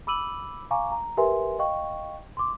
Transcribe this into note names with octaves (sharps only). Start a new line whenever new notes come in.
B5 D6 E6 D#7 F#7
F5 G#5 A#5 C#6 D6
A#5
G4 A#4 B4 E5 G#5 C6
D#5 F5 G5 C#6
C6 D6